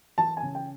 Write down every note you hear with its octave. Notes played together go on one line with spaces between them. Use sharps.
E3 A5
G#5
C#3
G5